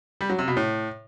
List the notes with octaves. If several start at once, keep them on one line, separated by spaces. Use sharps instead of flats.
G3
F#3
C3
B2
A2